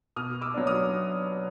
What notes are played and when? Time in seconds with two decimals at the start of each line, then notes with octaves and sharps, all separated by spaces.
0.16 B2 D#6 F6
0.41 D6 E6
0.54 F#3 B3 D4
0.67 D#6 F6